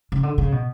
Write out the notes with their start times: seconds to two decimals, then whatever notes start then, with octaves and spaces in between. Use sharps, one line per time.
0.12 C#3
0.23 D3
0.38 C#3
0.52 B2